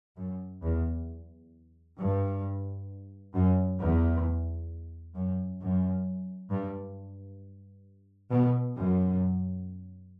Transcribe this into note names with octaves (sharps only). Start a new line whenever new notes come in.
F#2
E2
G2
F#2
E2
F#2
F#2
G2
B2
F#2